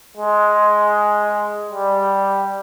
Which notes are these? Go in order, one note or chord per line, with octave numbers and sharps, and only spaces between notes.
G#3
G3